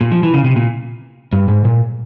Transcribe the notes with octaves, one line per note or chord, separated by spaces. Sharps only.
A#2
F3
E3
C#3
C3
A#2
G2
G#2
A#2